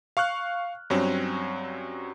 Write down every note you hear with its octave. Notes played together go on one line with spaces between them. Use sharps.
F5 C#6 F6 F#6
G2 F#3 C4 C#4